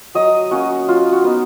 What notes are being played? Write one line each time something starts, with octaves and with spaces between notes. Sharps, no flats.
F#3 D#5
A#3 C#4 F#4
F#3 F4
F#4
B3 D#4